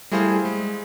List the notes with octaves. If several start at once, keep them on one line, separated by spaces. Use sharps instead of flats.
G3 A3 E4 G#4 C5 F5
G#3